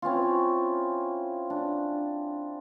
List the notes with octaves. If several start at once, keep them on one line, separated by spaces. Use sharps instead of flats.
C4 C#4 E4 F4
D4